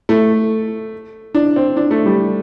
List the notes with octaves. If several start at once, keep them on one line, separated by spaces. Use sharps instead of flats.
A3
D4
C4
D4
A3
G3